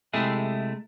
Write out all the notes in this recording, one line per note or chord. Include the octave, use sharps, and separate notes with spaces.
C3 G#3 A3 E4 G#4